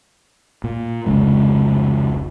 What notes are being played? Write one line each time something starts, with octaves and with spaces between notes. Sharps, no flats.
A#2
F1 C#2 C#3 G#3